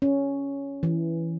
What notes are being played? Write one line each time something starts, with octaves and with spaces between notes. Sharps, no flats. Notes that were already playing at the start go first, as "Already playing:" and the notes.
C#4
E3